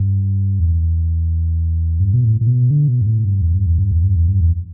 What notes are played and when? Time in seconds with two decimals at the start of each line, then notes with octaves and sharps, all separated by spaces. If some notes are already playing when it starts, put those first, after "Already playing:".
Already playing: G2
0.60 E2
2.00 G2
2.14 B2
2.25 A2
2.41 A2
2.47 B2
2.71 D3
2.88 B2
3.01 G2
3.06 A2
3.24 G2
3.41 E2
3.54 G2
3.66 E2
3.78 G2
3.91 E2
4.04 G2
4.15 E2
4.28 G2
4.40 E2